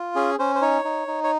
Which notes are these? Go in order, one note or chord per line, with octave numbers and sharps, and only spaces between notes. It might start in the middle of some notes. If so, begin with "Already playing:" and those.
Already playing: F4
C#4 G#4
C#4 C5
C5
D#4 C#5
D#4
D#4
C#5